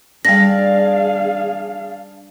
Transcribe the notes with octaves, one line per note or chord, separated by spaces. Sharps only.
G3 D4 G#4 F5 A#6